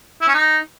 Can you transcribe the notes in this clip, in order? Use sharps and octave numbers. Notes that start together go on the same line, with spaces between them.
E4
C#4
D#4